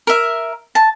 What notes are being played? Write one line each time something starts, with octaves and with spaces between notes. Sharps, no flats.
A#4 E5
A5